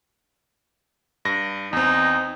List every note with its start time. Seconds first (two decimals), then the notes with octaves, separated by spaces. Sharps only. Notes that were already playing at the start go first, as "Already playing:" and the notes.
1.25 G2 A#6
1.73 E2 C4 D#4